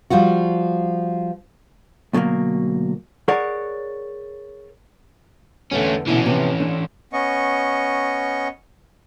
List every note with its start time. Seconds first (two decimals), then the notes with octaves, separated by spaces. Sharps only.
0.10 F3 G3 F4 F#4
2.13 D2 B2 F#3 G#3 A#3
3.28 G#4 A#4 C#5 D5 F#5
5.72 E2 D3 A3 C#4
6.08 B2 D3 E3 C#4 E4
6.26 C3 F3 B3
6.60 D4
7.13 B3 C#4 D#5 C#6